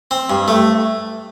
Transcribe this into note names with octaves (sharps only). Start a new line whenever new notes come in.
C4
G2
A3